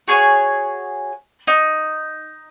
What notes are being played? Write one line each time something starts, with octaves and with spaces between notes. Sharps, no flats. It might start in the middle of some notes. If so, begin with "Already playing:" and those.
F#4 G#4 C#5 G#5
D#4